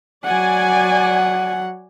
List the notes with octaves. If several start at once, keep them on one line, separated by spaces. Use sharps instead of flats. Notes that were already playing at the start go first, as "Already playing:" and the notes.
F#3 D5 F#5 G#5